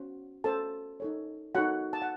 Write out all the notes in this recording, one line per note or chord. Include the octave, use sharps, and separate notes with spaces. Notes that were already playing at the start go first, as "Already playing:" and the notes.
Already playing: C#4 F#4 C5
C#4 F#4 A4 C5 A5
D#4 A4 C#5
D#4 F#4 A4 C#5 F#5
A5
F#5